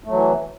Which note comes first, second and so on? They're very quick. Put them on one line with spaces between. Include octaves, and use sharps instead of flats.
A3 F#3 E3